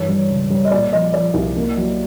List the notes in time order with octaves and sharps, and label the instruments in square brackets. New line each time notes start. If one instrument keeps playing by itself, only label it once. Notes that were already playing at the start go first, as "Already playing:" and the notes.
Already playing: [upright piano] G2 E3 C#5
G3
C#2
G3
D#5
A#2 D5
F3 D#5
F3 D5
C2
A#3
F#3